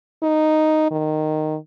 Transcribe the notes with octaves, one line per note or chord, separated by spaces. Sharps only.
D#4
D#3